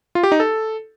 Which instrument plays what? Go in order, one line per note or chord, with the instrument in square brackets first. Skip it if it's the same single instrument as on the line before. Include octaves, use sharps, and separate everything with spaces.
[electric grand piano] F4
G4
D#4
A4